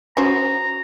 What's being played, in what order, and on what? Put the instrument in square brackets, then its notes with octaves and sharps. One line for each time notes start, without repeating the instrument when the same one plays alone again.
[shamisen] C#4 F#4 C5 [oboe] A#5